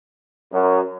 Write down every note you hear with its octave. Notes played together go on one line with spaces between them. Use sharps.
F#2